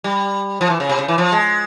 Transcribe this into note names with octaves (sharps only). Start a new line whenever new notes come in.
G3
F3
E3
C#3
C3
C#3
E3
F3
G#3